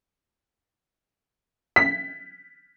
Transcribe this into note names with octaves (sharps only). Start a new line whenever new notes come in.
B6